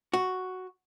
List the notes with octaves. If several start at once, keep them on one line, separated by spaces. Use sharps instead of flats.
F#4